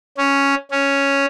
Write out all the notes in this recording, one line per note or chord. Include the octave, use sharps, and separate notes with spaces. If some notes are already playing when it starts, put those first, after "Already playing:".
C#4
C#4